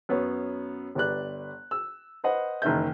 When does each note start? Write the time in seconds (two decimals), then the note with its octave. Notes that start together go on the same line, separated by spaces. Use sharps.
0.09 F#2 B3 C#5
0.95 G1 G4 B4 D5 F#6
1.71 E6
2.24 B4 C5 D#5 F#5
2.62 F#1 D#3 E3 E5 G6